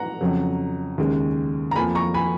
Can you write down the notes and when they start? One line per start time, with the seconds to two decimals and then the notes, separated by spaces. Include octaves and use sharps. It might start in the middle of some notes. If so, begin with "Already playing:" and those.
Already playing: F#5 A#5
0.21 F2 C#3 F#3
0.98 D#2 C#3 G#3
1.71 A#5
1.76 F2 F3 A#3 G#5 B5
1.95 A#5 C#6
2.14 G#5 B5